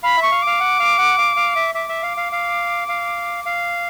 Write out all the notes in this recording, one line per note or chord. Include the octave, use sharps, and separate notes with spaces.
F5 B5
E5 C#6
F5
F5 D6
F#5
F5
F#5
F5
F5
E5
E5 D6
E5
F5
F5
F5
F5
F5